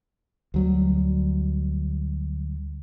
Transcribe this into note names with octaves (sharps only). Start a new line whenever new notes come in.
D2 F#3 G3